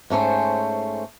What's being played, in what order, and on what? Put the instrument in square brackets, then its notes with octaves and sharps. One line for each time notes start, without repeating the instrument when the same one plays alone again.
[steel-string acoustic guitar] G#2 A3 C#4 C5